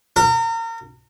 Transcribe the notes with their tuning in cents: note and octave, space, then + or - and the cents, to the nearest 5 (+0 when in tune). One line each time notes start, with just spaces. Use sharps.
A#4 -35